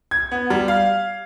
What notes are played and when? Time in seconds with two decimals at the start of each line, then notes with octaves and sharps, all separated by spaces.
0.11 G#6
0.31 B3
0.50 G3
0.68 F5